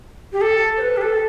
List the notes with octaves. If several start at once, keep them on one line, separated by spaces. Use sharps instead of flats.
G4
A4
C5
B4
G4
A4